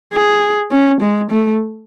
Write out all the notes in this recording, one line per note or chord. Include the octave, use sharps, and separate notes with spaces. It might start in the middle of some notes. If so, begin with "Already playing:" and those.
G#4
C#4
G#3
A3